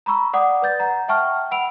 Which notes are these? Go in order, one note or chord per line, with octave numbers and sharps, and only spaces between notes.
A#5 B5 C#6 E6
D5 F#5 D6 D#6
B4 D5 G6 A6
F#5 A#5
E5 F#5 G5 A5 C#6 F6
F#5 B5 E6 D7 F7